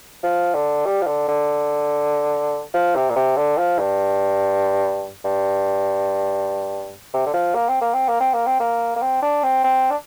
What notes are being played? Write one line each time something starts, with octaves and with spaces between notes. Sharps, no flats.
F3
D3
G3
F3
D3
D3
F3
C3
A#2
C3
D3
F3
G2
G2
C3
D3
F3
A#3
C4
A#3
C4
A#3
C4
A#3
C4
A#3
A#3
C4
D4
C4
C4
D4